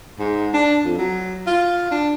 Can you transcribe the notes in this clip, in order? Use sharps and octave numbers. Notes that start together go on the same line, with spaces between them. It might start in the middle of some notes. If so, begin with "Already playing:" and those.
G#2
D4
F2
F#3
F4
D4